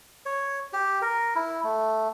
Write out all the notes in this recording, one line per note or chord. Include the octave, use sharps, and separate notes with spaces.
C#5
G4
A#4
E4
A3